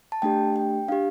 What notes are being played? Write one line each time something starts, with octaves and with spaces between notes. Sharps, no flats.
A5
A3 D4 G4 G5
G5
D4 G4 F5